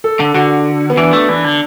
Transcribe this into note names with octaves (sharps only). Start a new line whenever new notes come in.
A4
D3
D3 F#4
B3
E3 D4
A3
E3 D4
D3